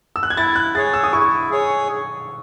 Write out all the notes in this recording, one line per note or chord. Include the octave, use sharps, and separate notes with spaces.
E6
F#6
G#6
E4 A6
F#6
G#4 C#5 A6
E6
D#6
E4 C#6
G#4 C#5